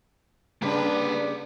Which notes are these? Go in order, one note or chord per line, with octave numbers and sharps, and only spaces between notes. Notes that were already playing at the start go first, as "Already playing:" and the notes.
C#3 G3 A#3 D4 B4